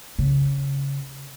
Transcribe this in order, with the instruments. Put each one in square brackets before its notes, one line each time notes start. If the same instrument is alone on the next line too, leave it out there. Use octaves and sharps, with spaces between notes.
[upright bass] C#3